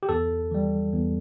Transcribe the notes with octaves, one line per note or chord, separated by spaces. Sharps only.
G4
E2 A4
E3 G3
E2